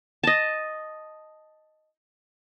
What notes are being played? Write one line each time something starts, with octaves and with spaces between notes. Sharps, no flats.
D#5 A5